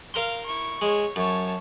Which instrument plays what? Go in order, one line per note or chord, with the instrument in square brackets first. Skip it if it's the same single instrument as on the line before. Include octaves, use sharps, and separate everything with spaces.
[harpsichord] A#4 C6 [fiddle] F5
[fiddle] E4 C#6
[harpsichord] G#3 [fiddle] C#5
[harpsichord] F#2 [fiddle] C#5 A5